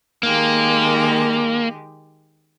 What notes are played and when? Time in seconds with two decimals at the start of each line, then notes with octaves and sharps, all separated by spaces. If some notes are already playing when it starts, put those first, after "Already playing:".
0.23 D#3 G#3 A#3 G4